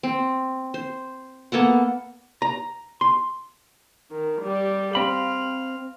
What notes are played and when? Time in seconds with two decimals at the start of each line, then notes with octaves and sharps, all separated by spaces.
0.03 C4
0.74 C5
1.52 A#3 B3 A4 F#5
2.42 A#5
3.01 C6
4.11 D#3
4.42 G3 G4
4.95 C4 F5 B5